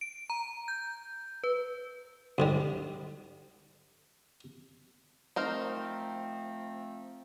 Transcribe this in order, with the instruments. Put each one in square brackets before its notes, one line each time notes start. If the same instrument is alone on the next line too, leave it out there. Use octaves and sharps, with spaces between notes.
[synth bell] D7
A#5
G6
B4
[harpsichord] D2 G#2 G3
[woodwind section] F3 A3 C4 [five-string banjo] D#4 A#4 C5